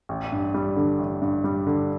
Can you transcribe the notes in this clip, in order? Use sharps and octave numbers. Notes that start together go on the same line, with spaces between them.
A1
G2
G3
D3
A1
G2
G3
D3